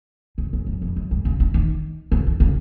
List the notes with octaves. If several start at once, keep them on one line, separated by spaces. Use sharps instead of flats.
C#3
C#3
F#2
F2
F#2
G#2
C#3
D#3
D#3
C#3
D#3
C#3